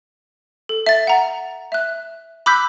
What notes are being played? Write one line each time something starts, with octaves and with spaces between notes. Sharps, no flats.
A4
E5 A6
F#5 A#5
E5 F#6
B5 D6 E6 F#6 G6 B6